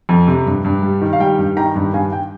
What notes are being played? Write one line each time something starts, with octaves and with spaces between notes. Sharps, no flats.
F2
C3
G2
G2
G3
D#3
F5
G3 G5
G2
D#3 G5 A#5
G2
G2 F5 G#5
G5